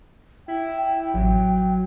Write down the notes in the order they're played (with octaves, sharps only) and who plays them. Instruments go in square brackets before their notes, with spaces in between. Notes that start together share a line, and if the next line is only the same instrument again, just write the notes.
[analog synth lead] E4 [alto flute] G5
[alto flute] G5
[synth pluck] A1 [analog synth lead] F#3